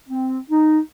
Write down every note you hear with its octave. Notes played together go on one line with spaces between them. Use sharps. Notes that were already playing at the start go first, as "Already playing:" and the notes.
C4
D#4